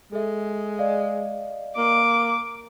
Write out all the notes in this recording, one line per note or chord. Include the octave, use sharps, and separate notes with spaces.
G#3 A4 E5
D5 D#5 F5
A#3 D6